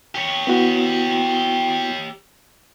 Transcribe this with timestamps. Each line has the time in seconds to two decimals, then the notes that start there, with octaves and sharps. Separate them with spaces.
0.15 G4 C#5
0.47 B3 E4 F#4